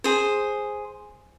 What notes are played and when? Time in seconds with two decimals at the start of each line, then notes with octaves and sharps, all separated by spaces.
0.04 G#4 C5